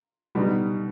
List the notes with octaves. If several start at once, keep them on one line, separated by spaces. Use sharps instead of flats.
B2 G3 B3 D#4